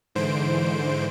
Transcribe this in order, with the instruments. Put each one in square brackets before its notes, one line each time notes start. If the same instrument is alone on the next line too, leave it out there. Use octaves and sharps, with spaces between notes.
[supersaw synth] G#2 D3 E3 C5 D7